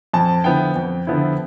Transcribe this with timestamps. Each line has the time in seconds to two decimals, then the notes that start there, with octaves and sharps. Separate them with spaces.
0.13 F2 A5
0.44 D3 F3 B3 E4 G5
0.76 F2
1.07 D3 F3 B3 E4